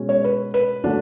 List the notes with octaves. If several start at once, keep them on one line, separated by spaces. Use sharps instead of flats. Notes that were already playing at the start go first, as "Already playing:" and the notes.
Already playing: B2 G#3 C#4
C#5
B4
B4
D3 F#3 A3 D4